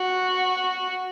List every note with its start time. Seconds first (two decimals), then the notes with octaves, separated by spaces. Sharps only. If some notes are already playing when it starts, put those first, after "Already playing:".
Already playing: F#4